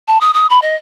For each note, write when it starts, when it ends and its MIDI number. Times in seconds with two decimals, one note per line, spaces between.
0.08 0.18 81
0.21 0.34 87
0.34 0.47 87
0.50 0.60 83
0.62 0.75 75